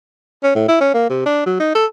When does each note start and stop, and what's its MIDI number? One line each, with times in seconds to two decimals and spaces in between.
0.43 0.52 61
0.55 0.68 45
0.68 0.76 64
0.81 0.91 61
0.94 1.08 58
1.10 1.26 48
1.26 1.44 62
1.46 1.58 54
1.60 1.75 63
1.75 1.86 69